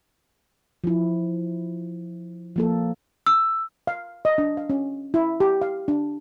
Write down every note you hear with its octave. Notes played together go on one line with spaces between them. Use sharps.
F3 E4
F3 A#3 A4
E6
F5
D#5
D4
F5
C#4
E4
G4
F5
D4